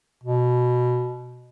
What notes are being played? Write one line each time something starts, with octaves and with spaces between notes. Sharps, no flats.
B2